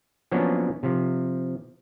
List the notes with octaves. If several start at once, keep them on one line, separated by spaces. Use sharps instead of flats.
F3 F#3 A#3 B3 C#4 D4
C3 F3